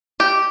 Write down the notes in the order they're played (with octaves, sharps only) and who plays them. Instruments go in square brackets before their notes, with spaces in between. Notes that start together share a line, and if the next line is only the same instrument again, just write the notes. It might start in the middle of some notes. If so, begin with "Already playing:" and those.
[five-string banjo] G4